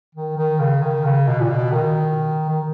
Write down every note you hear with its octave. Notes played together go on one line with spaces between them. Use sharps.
D#3
D#3
C#3
D#3
C#3
B2
A#2
B2
D#3
D#3